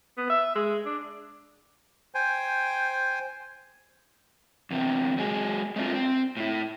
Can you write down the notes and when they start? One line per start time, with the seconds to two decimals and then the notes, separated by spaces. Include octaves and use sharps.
0.18 B3
0.30 E5
0.55 G#3
0.86 D4
2.15 C5 G5 G#5
4.71 E2 C3 C4
5.18 F#3 G#3 G#4
5.76 G#3 A3 C4 D4 F4
5.94 C4
6.37 A2 E4